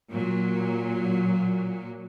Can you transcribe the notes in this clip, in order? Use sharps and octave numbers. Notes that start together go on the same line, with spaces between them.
A#2 F#3